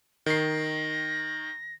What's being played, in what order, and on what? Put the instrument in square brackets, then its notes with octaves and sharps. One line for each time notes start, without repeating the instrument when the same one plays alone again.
[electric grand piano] D#3 C7 [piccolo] A#6